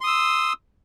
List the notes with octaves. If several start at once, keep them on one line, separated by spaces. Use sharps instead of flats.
C6 D#6 E6